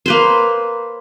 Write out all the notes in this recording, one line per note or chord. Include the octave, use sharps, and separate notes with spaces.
A#3 B4 C5